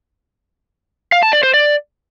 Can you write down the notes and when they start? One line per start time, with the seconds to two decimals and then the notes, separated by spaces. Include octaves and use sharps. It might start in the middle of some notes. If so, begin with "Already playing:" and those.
1.12 F5
1.23 A5
1.33 D5
1.43 C5
1.54 D5